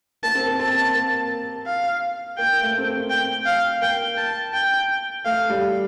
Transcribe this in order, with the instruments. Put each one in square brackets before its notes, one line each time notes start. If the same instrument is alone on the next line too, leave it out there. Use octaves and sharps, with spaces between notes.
[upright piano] A#3 [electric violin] A5
[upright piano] C4
A#3
[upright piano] C4 [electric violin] A5
[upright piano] A#3
[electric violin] F5
[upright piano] A#3 [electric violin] G5
[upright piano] A3
C4
A#3
[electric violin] G5
F5
[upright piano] A#3 [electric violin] G5
[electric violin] A5
G5
[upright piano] A3 [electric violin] F5
[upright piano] G3